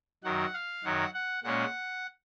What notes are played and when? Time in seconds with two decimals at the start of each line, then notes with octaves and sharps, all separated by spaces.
0.24 F#2 D#3 F#3 F#5
0.54 F5
0.84 F#2 D#3 F#3 F#5
1.14 F#5
1.43 A#2 G#3 C#4 F#5